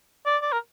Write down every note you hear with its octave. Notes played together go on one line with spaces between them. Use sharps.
D5
D5
A#4